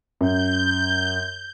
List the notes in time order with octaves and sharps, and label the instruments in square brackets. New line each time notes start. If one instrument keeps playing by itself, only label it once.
[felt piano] F#2 [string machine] G6